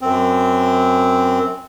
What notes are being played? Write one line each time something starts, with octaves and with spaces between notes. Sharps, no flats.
F#2 C4